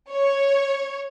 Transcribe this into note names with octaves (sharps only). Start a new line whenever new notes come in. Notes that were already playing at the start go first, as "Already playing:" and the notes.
C#5